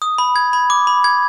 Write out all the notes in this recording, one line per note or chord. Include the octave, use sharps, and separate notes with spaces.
D#6
B5
G#6
B5
D6
B5
G#6